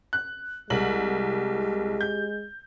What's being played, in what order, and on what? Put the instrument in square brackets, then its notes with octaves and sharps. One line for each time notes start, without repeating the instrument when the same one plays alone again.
[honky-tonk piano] F#6
[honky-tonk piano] C2 F#7 [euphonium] G#3 [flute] G4
[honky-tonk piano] G6